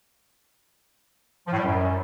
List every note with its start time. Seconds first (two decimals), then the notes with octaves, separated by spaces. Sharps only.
1.47 F3
1.53 A2
1.58 G3
1.64 F#2